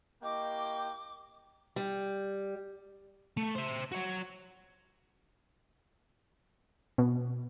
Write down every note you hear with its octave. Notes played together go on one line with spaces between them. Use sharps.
A#3 E4 G4 D#5 G5 C#6 D6
G3
A3
C5 E5
F#4 C#5
B2